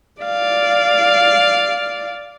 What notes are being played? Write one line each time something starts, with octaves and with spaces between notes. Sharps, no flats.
D5 F5